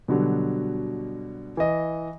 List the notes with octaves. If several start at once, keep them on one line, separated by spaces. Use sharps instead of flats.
B2 D3 F#3 G3
E3 D#5